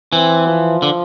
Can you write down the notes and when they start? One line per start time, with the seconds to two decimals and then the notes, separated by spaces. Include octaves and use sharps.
0.12 E3 C4
0.48 F3
0.82 D3